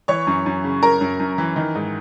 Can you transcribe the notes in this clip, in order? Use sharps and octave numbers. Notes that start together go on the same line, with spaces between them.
E3 C#5 C#6
F#2
F#2
C#3
F#2 A#4 A#5
F#2
F#2
E3
D#3
G#2